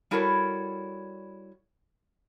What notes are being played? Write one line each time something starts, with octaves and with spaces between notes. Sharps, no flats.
G3 E4 F#4 A4 A#4 C#5